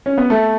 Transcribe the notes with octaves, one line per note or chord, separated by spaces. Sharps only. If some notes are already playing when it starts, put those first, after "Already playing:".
C#4
B3
A3